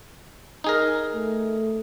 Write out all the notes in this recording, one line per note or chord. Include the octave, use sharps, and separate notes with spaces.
D#4 G#4 A#4
A3